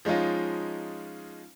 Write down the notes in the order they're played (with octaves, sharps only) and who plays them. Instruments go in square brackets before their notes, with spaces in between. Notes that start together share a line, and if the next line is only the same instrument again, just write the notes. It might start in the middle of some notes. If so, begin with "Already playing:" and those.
[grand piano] F3 G#3 C#4 D#4 F4